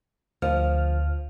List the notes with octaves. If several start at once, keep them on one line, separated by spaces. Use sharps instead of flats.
D2 F3 F6